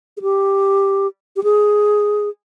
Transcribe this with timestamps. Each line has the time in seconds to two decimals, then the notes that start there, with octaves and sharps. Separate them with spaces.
0.17 G#4
0.22 G4
1.36 G4
1.44 G#4